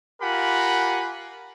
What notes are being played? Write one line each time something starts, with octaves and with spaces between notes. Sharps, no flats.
F4 G4 A#4 F#5 G#5 B5